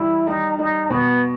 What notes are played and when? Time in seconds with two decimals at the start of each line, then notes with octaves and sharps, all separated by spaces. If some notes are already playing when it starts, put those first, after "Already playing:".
Already playing: E3 G3 E4
0.27 G3 D#4
0.59 G3 D#4
0.90 B2 B3